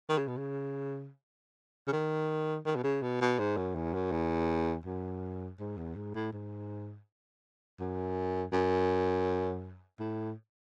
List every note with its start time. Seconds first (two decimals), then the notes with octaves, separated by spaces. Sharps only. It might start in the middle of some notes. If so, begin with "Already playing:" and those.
0.09 D#3
0.18 C#3
0.28 B2
0.37 C#3
1.88 C#3
1.92 D#3
2.66 D#3
2.76 B2
2.84 C#3
3.02 B2
3.21 B2
3.39 G#2
3.57 F#2
3.76 E2
3.94 F#2
4.12 E2
4.86 F#2
5.60 G#2
5.78 E2
5.96 G#2
6.14 A2
6.33 G#2
7.79 F#2
8.52 F#2
9.99 A2